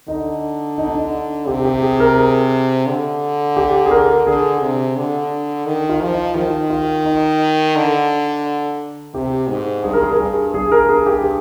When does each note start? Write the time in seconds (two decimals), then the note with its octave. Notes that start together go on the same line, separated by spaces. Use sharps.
0.08 D3 D#4
0.78 D#4
0.88 D4
0.97 D#4
1.47 C3 G4
1.65 G4
1.82 G#4
2.00 A#4
2.17 G#4
2.86 D3
3.57 G4
3.86 G#4
3.91 A#4
4.27 D3 G#4
4.61 C3
4.96 D3
5.66 D#3
5.89 F4
6.01 F3
6.12 D#4
6.35 D#3 F4
6.70 F4
7.05 D#4
7.75 D3
9.14 C3 G4
9.49 G#2
9.84 G2 G#4
9.93 A#4
10.03 G#4
10.12 A#4
10.19 G2 G#4
10.54 G2 G#4
10.72 A#4
10.89 G#4
11.06 G4
11.24 G#4